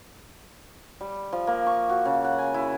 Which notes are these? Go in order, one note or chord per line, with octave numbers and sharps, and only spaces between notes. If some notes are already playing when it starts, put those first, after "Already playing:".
G3
F3
A#3
C#6
F#4
C#3
F#5
G#5
E4